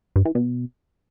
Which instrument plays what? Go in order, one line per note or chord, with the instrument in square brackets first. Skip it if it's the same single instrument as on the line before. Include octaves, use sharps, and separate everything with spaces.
[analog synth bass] G2
E3
B2